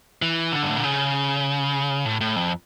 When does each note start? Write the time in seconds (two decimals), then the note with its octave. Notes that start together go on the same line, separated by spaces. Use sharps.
0.22 E3
0.52 D3
0.63 G2
0.69 A2
0.77 A#2
0.84 C#3
2.05 A2
2.21 A2
2.36 F2